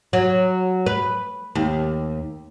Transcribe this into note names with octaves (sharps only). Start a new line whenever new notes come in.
F#3
B4
D#2